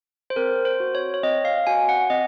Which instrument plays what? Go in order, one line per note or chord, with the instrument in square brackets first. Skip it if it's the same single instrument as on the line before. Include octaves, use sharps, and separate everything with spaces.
[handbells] C5
C4 A#4
C5
F#4
C#5
C#5
C4 D#5
F5
F#4 G#5
F#5
C4 D#5